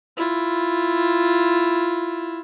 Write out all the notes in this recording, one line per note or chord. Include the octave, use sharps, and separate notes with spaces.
E4 F4